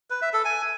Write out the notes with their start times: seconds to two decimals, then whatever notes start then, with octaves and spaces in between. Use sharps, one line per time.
0.10 B4
0.22 E5
0.33 A4
0.45 G#5